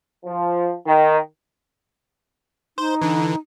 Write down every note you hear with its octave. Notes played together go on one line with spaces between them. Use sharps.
F3
D#3
D#4 C5
D3 E3